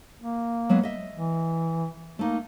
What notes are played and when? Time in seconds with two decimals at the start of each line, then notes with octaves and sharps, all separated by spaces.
0.20 A#3
0.69 F#3 G#3 B3
0.83 D#5 E5
1.14 E3
2.19 A3 A#3 D#4